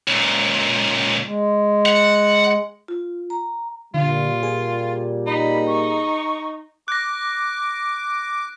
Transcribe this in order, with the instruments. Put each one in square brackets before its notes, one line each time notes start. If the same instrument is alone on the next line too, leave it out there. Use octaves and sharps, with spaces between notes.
[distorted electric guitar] C#2 A#2
[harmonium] G#3
[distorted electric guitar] F#5
[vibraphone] F4
A#5
[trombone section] A#2 G3 [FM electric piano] D3 [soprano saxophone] F4
[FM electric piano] G#4
[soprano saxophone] D#4 [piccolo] B5
[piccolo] C#6
[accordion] D6 [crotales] F#6 A#6